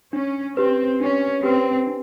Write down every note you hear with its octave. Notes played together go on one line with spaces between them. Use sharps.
C#4 D4
C4 G4 B4
C#4 D4
C4 G4 B4
D4